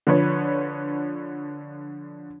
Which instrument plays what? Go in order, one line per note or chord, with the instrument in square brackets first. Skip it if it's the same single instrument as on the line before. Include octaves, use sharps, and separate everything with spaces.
[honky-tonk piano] D3 F3 B4 C#5